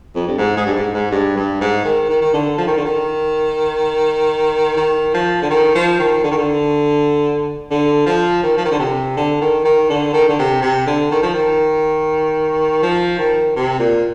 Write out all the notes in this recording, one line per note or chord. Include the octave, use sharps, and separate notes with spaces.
F2
G2
G#2
G#2
G2
G#2
G#2
G2
G2
G#2
D#3
D#3
D#3
D3
F3
D#3
D3
D#3
D#3
F3
D3
D#3
F3
D#3
D3
D#3
D3
D3
F3
D#3
F3
D#3
D3
C3
D3
D#3
D#3
D3
D#3
D3
C3
C3
D3
D#3
F3
D#3
F3
D#3
C3
A#2